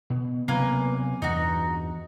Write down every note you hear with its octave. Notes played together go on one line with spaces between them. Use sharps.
B2
C3 F#3 A#3 B3 B4 G#5
E2 G2 D#4 F#4